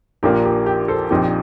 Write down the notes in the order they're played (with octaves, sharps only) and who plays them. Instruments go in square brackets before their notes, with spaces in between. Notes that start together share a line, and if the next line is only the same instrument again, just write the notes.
[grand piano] A#1 A#2 F3 A#3 D4 G4 A#4
G4
G4
A4 C5
A#1 A#2 F3 C4 D#4 G4